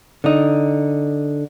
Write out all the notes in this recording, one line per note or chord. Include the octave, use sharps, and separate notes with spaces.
D3 D#4